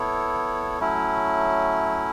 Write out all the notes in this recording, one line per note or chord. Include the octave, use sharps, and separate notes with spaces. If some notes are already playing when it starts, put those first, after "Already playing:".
Already playing: B3 E4 A4 C#5
F#3 A3 C#4 E4